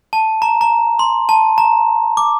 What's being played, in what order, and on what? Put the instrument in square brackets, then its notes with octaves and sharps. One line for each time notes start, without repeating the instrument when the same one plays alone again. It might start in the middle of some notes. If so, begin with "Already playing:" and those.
[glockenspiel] A5
A#5
A#5
C6
A5
A#5
D6